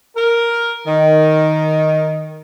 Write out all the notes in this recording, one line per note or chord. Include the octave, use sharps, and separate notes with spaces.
A#4
D#3